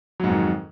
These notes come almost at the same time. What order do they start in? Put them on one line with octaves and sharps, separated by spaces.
F#3 G#2 F2 D#3